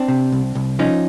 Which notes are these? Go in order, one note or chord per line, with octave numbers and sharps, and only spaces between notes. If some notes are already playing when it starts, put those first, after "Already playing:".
Already playing: C4 D4
C3
C2
C2
F3 C#4 D#4